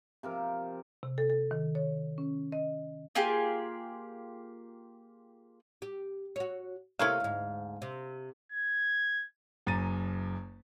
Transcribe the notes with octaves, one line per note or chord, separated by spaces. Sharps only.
C3 F3 A#4
C3
A4
A4
D#3
C#5
C#4
D#5
A#3 F4 G4 G#4
G4
F#4 C#5
C3 A3 A#3 E4 C#5 F5
D2 G#2
C3
G#6
F#1 F#2 A#5 A6 D#7